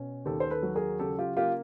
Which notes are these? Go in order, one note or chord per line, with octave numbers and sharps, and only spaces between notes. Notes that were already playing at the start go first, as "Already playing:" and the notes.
Already playing: B2 C#4
D#2 G4 A4
C5
A4 B4
F#3
G#4 A#4
C#3 G4 A4
F4 G4
A#3 F4 G4